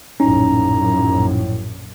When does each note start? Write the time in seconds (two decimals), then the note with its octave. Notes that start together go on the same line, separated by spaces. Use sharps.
0.20 A#1 F#2 A2 C#4 D#4 A#5